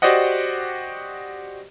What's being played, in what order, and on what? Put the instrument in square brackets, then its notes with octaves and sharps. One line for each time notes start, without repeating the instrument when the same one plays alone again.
[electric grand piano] F#4 G4 C5 D5 D#5 F#5